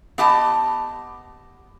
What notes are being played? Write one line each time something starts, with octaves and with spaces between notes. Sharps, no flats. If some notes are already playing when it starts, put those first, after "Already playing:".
B3 G4 D#5 A5